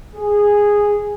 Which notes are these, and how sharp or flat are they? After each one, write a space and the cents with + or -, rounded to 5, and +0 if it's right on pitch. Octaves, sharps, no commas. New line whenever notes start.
G#4 -10